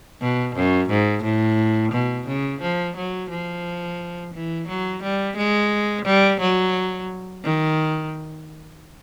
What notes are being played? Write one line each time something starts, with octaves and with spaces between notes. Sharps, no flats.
B2
F#2
G#2
A2
B2
C#3
F3
F#3
F3
E3
F#3
G3
G#3
G3
F#3
D#3